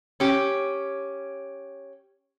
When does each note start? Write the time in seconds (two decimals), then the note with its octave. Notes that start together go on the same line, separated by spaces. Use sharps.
0.20 C#4 G4